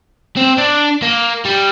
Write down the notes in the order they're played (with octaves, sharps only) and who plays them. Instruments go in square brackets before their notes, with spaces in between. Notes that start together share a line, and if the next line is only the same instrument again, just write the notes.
[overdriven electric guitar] C4
D4
A#3
G3